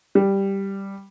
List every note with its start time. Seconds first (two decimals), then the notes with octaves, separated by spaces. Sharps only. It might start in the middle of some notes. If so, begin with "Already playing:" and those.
0.15 G3